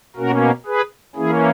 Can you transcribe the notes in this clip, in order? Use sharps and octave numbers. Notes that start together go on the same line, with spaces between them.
B2 A#3 C#4 F#4 A#4
G#4 B4
E3 A#3 C#4 E4 G#4